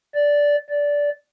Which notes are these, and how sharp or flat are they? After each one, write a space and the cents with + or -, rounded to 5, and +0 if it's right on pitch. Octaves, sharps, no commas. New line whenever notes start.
D5 -10
D5 -15